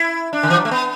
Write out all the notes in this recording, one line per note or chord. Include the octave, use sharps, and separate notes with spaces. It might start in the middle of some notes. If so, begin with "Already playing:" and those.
Already playing: E4
D4
D3
E3
F#3
A3
B3